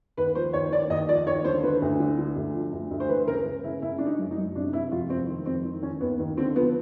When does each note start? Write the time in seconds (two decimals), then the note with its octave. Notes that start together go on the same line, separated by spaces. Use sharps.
0.17 D#2 B4
0.35 F3 C5
0.53 D#2 C#5
0.72 D#2 D5
0.90 D#2 D#5
1.09 F3 D5
1.26 D#2 C#5
1.45 D3 C5
1.63 D3 B4
1.82 D2
2.00 D3
2.18 D3
2.36 D2
2.54 F3
2.72 D2
2.91 D2
3.00 C5
3.09 E3 B4
3.28 C#3 A#4
3.46 C#3
3.64 C#3 E4
3.82 C#3 E4
3.98 C#3 D4
4.07 D#4
4.18 F#2
4.31 D#4
4.37 F#2
4.55 C3 D4
4.73 C3 E4
4.92 F2 F4
5.10 F2 C4
5.28 D#3
5.46 F2 C4
5.64 D#3
5.83 D#3 C#4
6.01 D#2 B3
6.19 D#2
6.37 D3 C4
6.55 F3 B3